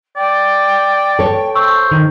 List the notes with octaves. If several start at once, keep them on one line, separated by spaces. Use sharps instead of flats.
D5 G5
A4 C#5
C5 C#6 E6
D#3